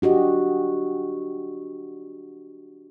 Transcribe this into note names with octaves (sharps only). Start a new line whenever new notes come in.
D4 F#4 G4 D#5